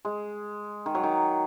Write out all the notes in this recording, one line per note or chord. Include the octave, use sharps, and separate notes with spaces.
G#3
D#3
F#3
D#3